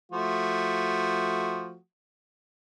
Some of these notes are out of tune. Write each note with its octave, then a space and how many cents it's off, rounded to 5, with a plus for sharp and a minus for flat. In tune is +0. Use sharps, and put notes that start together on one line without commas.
F3 +0 A3 +0 F#4 +0